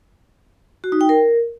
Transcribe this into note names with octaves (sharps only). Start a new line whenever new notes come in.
F#4
D#4
G5
A#4